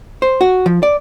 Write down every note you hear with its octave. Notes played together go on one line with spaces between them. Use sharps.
C5
F#4
F3
D5